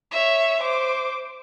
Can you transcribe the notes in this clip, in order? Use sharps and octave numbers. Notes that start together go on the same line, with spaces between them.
C#5 E5
C5 D6